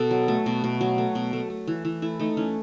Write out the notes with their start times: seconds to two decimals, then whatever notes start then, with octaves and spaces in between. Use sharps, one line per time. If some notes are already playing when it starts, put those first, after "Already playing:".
Already playing: B2 A4
0.11 F#3
0.28 A3
0.46 B2
0.64 B2
0.81 F#3
0.98 A3
1.15 B2
1.33 A3
1.50 A3
1.67 E3
1.85 E3
2.02 A3 E4
2.19 A3 D#4
2.37 E3 C#4